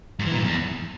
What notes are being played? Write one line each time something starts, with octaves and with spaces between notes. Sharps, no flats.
G#2
E3
A#2
G2
E2